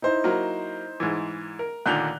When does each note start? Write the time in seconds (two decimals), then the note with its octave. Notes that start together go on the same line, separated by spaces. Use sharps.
0.02 D#4 E4 C5
0.24 F#3 A#3
1.00 G#2 E3
1.59 A#4
1.86 D#2 A#2 D3 F#6 G6 F7